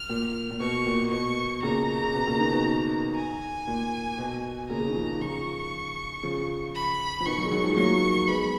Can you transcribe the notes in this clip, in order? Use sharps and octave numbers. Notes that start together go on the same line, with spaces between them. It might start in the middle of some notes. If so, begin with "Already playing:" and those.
Already playing: F6
A#2
A#2
B2 C#6
A#2
B2 C#6
A#2 C#3 A#5
C#3
B2
A#2 C#3
B2 D#3
B2
G#5
A#2
B2
A#2 C#3 A#5
C#3
D#3
C#3 F3
C#3 F3 C#6
C#3 F3
B5
F3
B2 D#3 C#6
D#3 F#3
G#3
D#3 F#3
F3 G#3
F#3 A#3 C#6
G#3 B3 B5